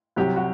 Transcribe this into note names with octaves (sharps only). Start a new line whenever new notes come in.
C2 C3 F#3 G4
F#4